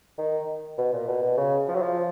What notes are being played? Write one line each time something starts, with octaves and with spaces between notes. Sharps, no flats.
D#3
B2
A#2
B2
B2
C#3
F3
F#3
F3